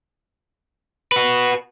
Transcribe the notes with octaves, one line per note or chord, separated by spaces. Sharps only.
F#4 B4